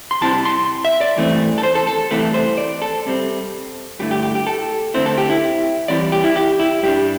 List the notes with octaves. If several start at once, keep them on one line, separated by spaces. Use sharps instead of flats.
C6
C3 G3 C4 E4 A5
C6
E5
D5
G2 E3 A3 C4
A4
C5
A4
A4
C2 C3 E3 A3 C4 A4
C5
D5
A4
C2 C3 G3 C4
G2 D3 A3 E4 G4
G4
G4
G4
A4
D2 D3 A3 C4 E4 C5
A4
G4
E4
E2 E3 G3 C4 E4 D5
G4
E4
G4
E4
G2 G3 D4 G4